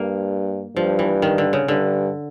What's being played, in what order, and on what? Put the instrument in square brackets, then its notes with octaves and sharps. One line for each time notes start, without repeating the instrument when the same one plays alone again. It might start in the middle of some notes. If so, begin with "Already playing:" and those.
Already playing: [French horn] G2 [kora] A#3
[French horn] G2 [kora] F3
[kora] E3
D#3
D3
C#3
[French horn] G2 [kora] D3